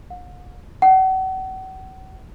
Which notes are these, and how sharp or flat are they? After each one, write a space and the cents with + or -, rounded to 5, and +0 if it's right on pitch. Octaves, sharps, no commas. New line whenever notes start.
F#5 -45
F#5 +35